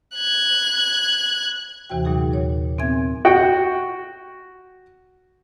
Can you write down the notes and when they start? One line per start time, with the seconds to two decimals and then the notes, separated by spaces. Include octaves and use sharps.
0.16 F#6 G#6
1.90 D#2 C3 E3 F#4 G5
2.05 A#2 F#3 D#4 G#4
2.33 D#2 A#2 C#5
2.78 A#2 B3 C4 E5 G#5 G#6
3.25 F#4 G5